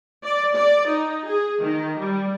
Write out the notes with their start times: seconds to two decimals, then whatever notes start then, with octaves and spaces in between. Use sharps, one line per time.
0.24 D5
0.56 D5
0.87 D#4
1.26 G#4
1.61 D#3
1.98 G3